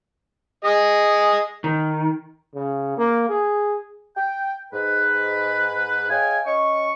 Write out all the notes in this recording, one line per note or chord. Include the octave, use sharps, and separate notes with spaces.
G#4 D#5
D#3
C#3
A#3
G#4
G5
G#2 B4
G#4 C#5 D#5 F5 G5 G#5
C#4 D#5 C#6